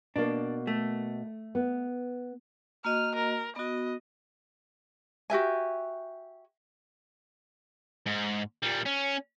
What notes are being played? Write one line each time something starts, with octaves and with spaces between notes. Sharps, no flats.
B2 A#3 D4
A3
B3
A#3 F#4 D#5 F6
A#4
B3 F#4 D#5
F#4 G4 E5 G#5
G#2
A#2 G3
C#4